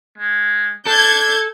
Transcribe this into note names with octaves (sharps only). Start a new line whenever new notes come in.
G#3
D4 A4 G6 G#6